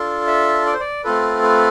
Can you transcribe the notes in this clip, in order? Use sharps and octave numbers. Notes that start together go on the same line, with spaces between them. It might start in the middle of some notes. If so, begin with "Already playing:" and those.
Already playing: D4 F4 A4
E5
D5
C5
D5
A3 C4 F4 A4 B4
B4